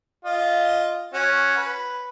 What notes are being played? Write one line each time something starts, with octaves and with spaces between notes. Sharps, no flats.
F4 D#5
C#4 F#4
B4